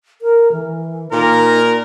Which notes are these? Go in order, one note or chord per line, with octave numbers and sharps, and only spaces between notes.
A#4
E3
A#2 D#4 A#4